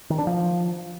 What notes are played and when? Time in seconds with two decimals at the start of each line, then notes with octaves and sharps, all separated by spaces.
0.10 D#3
0.18 D4
0.27 F3